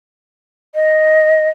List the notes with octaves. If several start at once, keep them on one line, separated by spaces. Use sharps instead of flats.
D#5